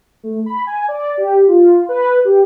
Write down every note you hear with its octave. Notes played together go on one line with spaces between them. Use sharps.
A3
B5
G#5
D5
G4
F4
B4
G4